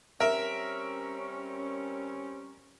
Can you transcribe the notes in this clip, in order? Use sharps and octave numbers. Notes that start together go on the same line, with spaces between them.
G3 C4 C#4 A#4 E5